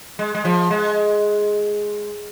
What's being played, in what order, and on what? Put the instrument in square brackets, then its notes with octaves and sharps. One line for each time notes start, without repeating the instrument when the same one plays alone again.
[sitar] G#3
G#3
F3
G#3